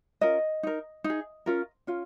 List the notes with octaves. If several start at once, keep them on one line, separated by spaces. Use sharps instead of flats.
C#4 F4 A#4 D#5
D#4 A#4
D#4
G#4
C#4 F4 A#4
C#4 F4